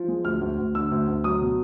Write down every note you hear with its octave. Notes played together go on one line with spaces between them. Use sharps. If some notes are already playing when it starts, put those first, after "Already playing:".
Already playing: F3
G#3
D2 F6
D2
D2
D3 E6
D2
D2
F#3 D#6
B2